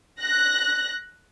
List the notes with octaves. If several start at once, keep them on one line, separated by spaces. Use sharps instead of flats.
F#6 A#6